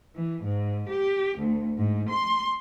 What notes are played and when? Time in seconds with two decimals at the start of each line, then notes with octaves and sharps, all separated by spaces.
0.14 E3
0.44 G#2
0.89 G4
1.39 D2
1.77 G#2
2.09 C6